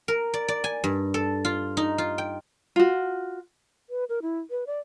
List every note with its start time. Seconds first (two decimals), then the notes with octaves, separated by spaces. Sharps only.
0.08 A#4
0.34 D5
0.48 D5
0.64 G#5
0.84 G2
1.14 A4
1.45 F4
1.77 D#4
1.98 F4
2.18 G5
2.76 F4 F#4
3.90 B4
4.09 A#4
4.22 E4
4.51 B4
4.67 D5